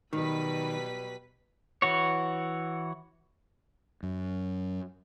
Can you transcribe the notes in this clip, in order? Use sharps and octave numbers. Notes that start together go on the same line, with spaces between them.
B2 D#3 F#3 G3 B4 B6
E3 F#4 C#5
F#2